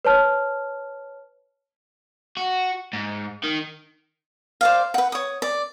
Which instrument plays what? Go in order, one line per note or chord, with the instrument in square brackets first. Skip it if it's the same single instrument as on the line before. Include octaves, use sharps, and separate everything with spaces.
[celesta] B4 C#5 A5 F6
[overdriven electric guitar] F#4
G#2
D#3
[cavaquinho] C5 D5 F5
B4 F#5
C#5 D#6
D5